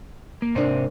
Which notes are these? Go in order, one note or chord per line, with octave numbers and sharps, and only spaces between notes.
A#3
G#2 C3 A#3 D4 C5